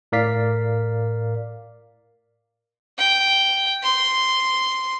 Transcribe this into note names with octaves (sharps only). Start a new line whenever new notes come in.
A2 A#4 D5 F5 B6
G5
C6